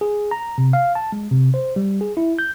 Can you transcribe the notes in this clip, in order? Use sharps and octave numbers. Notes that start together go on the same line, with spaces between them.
G#4
A#5
C3
F5
A5
G#3
C3
C5
G3
G#4
E4
G6